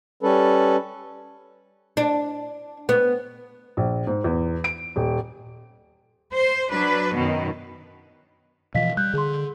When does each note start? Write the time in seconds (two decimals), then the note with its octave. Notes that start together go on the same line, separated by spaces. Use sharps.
0.23 G3 C#4 A4 B4
1.97 D4
2.89 B3
3.77 A#1
4.07 G#2
4.24 E2
4.64 D7
4.96 D#1
6.32 C5
6.70 F#3 D4 B4
7.15 F#2 B2 D#3
8.75 B2 E3 F3 D#5 F5 B6
8.97 G3 F#6 G6
9.13 D3 G#4 C6